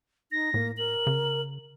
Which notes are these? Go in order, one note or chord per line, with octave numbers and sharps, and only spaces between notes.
D#4 A#6
A2 A#3
A#4 F#7
C#3